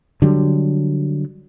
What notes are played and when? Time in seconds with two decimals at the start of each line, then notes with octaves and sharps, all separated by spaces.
0.22 D3 F#3 G3